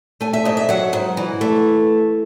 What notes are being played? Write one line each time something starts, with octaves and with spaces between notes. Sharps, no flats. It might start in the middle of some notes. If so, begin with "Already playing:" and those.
A3 G#5
E5
G#2 D#5
E5
F#3 F#5
G#2
E3
A3